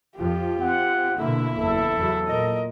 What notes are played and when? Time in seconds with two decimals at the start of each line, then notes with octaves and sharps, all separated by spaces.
0.17 F2 F3 F4 G4
0.60 C4 F#5
1.18 B2 D3 A#3 E4 E5
1.58 F#1 E2 A4
1.98 E2 C#3 F#3
2.27 A#2 A#4 D#5